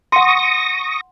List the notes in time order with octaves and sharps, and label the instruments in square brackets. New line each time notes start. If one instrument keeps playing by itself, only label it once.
[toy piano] F#5 C6 [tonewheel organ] C#6 D#6 A#6